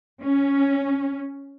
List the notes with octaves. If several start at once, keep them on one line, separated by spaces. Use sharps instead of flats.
C#4